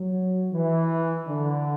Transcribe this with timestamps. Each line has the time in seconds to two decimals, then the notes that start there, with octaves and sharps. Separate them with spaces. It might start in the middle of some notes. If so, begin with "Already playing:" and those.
Already playing: F#3
0.52 E3
1.27 D3